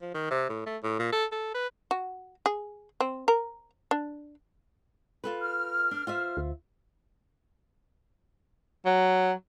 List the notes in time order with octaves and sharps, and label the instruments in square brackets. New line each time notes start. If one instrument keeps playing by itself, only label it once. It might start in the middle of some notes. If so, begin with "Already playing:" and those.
[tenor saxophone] F3
D#3
C3
A2
A3
A2
A#2
A4
A4
B4
[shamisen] F#4
G#4
C4
A#4
D4
[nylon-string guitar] F4 A4 B4
[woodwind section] F6
[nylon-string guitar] D4
F4 C5 E5
[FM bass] D2
[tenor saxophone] F#3